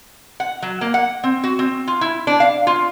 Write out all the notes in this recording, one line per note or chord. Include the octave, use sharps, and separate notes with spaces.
F#5
F#3
A#3
F#5
C4
F#4
C4
F4
E4
D4
F5
F4